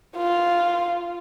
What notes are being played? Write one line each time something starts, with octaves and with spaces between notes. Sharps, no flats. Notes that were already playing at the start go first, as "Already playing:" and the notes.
F4